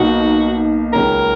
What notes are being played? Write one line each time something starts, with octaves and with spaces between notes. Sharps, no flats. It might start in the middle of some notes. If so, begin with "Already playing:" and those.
Already playing: B1 B2 A#3 D#4 F#4
C#2 C#3 F#3 C#4 A#4